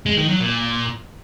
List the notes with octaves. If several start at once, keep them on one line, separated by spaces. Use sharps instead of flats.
G#3
D#3
F#3
A#2